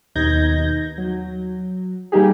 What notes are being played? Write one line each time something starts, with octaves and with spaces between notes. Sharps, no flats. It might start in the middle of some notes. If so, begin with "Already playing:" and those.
D#2 B2 D#4 G6 G#6 A#6
F#3
G3 A#3 D#4 G4 G#4